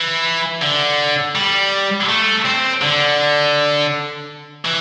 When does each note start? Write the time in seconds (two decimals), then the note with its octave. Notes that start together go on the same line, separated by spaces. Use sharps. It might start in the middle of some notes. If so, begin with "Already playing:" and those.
Already playing: E3
0.62 D3
1.35 G3
2.08 A3
2.45 C4
2.82 D3
4.65 E3